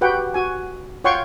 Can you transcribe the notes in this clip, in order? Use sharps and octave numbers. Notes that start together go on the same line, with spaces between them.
F#4 G4 B4 F#5 G5
F#4 G#5
F4 C#5 F#5 G5 C6 C#6